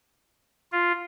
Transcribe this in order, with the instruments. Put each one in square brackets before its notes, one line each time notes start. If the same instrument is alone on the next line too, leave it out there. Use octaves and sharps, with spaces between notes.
[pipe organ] F4